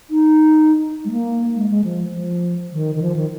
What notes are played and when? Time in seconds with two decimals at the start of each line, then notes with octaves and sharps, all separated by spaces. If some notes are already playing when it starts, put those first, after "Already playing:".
0.10 D#4
1.05 G#3
1.11 A#3
1.56 G#3
1.70 G#3
1.84 F3
2.14 F3
2.73 D#3
2.95 D#3
3.02 F3
3.16 D#3